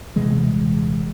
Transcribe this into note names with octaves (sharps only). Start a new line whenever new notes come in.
D#1 C3 E3 G#3